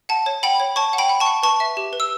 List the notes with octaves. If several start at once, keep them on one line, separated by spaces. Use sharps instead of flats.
F#5 A5
C#5
F#5 G5 B5
C#5
C#5 A5 C#6
F#5
G5 B5
F#5
A5 C#6
F#5
B4 A5 C#6
E5
G4
B4
E6